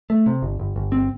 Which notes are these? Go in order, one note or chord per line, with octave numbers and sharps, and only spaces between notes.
A3
C3
G1
G1
G1
C4